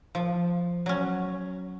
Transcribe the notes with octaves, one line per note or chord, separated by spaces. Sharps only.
F3
F#3 C#4